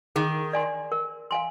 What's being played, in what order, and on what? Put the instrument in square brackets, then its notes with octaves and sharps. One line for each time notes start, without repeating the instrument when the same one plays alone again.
[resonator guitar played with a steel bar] D#3 [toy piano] G#4
[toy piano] D5 G#5 C6
A#4
F5 G#5 C6